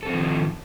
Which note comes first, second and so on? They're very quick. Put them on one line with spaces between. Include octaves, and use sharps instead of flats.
A4 C4 F3 D#3